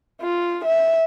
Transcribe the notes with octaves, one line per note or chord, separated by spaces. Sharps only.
F4
E5